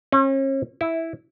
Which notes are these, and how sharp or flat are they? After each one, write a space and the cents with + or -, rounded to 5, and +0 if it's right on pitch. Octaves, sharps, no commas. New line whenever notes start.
C#4 -40
E4 -5